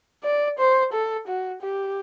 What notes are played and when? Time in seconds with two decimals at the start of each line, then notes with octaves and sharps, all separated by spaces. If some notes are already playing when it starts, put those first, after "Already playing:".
0.24 D5
0.59 C5
0.93 A4
1.28 F#4
1.62 G4